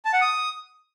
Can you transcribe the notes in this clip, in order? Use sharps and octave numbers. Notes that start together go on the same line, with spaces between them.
A5
F#5
D#6